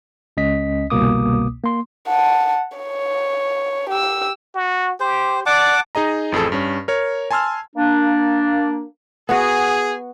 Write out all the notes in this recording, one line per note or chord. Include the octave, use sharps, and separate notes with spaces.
C#2 C#4 D#5 B6
G1 C2 B2 A#3 D6 D#6
A#3 C6
F#5 A5
C#5
G4 E6
F#4
G4 C5
D5 F#5 A5 D6
D#4 G#4 D#5 A#5
A1 F2 G#4 A4
G2 C#4
A#4 C#5
G#5 A5 C6 E6 F6
A#3 D4
B3 F#4 G#4